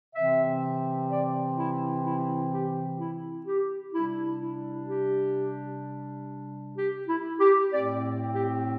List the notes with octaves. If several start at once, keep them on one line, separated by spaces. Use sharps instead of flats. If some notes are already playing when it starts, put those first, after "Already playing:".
C3 E3 C4 E5
D5
E4
E4
G4
E4
G4
C3 G3 D4 E4
E4
G4
G4
E4
G4
A2 A3 C4 D5
G4